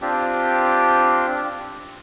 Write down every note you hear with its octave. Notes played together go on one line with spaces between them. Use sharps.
C4 D4 F4 G4